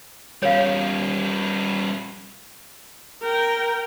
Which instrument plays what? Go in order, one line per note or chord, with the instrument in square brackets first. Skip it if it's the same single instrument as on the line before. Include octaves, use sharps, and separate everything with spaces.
[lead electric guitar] G3 C#4 [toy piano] C#5 F5
[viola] A#4 G5